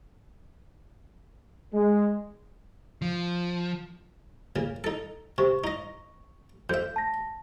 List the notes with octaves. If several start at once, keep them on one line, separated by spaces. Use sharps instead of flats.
G#3
F3
A#2 C#3
D#4 A4
C3 C#6
D#4 D#5
F2 E5 G6
A5 A#6